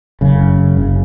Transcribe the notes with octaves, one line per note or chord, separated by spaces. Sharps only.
F#1 F#2 C#3
F#1 C#3